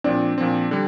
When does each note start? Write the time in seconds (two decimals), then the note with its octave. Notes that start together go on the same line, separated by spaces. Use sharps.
0.04 A#2 F3 C4 D4
0.38 A#2 F3 C4
0.71 D3 G3